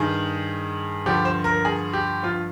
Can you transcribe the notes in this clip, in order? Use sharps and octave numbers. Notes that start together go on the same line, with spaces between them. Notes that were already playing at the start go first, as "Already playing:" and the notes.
Already playing: G2 D#3 G#4
G2 D3 F3 G4
C5
A#4
G#4
G4
G2 F3 F4